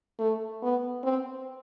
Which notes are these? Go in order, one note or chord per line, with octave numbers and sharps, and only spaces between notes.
A3
B3
C4